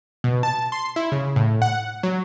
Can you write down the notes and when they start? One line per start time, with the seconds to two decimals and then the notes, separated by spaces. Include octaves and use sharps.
0.24 B2
0.43 A5
0.72 C6
0.96 E4
1.12 C#3
1.36 A2
1.62 F#5
2.03 F#3